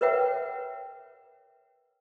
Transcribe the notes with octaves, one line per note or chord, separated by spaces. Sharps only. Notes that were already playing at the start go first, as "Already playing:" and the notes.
A#4 B4 C#5 E5 F#5 G5